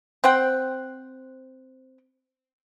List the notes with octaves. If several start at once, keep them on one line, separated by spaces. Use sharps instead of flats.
C4 C5 F#5 G5